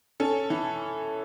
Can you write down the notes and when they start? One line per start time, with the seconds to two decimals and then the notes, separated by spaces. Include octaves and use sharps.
0.20 C#4 A4
0.50 E3